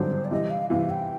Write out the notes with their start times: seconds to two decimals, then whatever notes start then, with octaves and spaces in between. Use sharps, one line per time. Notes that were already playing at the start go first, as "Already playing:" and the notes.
Already playing: G#1 G2 D3 F#3 C5
0.25 D5
0.31 C3 E3 G3 D#5
0.50 F5
0.70 C3 E3 G3 F5
0.90 G5